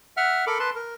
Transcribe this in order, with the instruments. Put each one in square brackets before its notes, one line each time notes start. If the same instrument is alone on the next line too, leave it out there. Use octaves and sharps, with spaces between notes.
[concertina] E5 F#5 F6
A4 A#4 B5 D6
B4 A5 C6
A#4